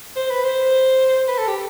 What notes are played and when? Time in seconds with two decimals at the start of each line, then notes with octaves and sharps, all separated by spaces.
0.16 C5
0.30 B4
0.44 C5
1.28 B4
1.38 A4
1.48 G4